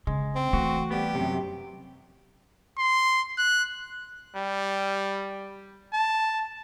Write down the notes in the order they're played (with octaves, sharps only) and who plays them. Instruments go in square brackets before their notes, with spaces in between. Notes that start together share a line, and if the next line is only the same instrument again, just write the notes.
[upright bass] C#3 [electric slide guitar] G#3
[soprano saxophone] C4
[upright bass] E3 A3 [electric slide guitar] F#4
[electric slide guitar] G3 B3 [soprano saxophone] G4
[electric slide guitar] F#2 C3
[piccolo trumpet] C6
F#6
[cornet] G3
A5